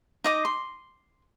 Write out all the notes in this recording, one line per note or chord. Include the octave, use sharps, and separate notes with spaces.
D#4 D#5 D6
C6